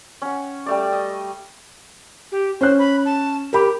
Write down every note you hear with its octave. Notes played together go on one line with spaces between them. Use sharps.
C#4 F#5
G3 A3 D5
D#5
G4
C#4 C5 F#6
B5
A5
G4 A#4 B5 D6